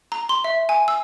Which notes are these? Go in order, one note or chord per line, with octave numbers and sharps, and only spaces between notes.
A#5
C6
E5
G#5
E6